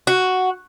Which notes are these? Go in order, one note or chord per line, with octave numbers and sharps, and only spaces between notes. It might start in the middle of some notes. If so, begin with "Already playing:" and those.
F#4